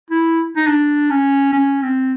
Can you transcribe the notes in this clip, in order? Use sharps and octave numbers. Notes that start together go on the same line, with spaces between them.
E4
D#4
D4
C#4
C#4
C4